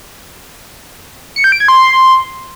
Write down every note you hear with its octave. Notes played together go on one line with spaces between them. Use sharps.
C#7
G6
D7
G#6
C6